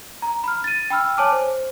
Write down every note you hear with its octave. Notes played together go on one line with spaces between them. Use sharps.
A#5
B5 F6
A6 D#7
G5 B5 E6 F6
C#5 G#5 A5 D6 F6
C5